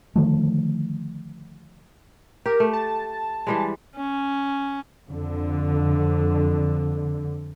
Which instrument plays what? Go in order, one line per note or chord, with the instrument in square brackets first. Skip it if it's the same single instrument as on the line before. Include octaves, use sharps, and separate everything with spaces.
[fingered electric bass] D3 D#3 F3 A3
[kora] G4 [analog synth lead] A#4
[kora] A3
[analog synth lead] A5
[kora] E3 G3 G#3
[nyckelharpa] C#4
[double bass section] F2 D3